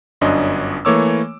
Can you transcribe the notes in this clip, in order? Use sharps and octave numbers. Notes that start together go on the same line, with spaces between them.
G1 F#2 C#4 D4 D#5
E3 A3 A#3 C#5 D6 E6